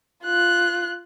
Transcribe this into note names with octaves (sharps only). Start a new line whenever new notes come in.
F4 F#6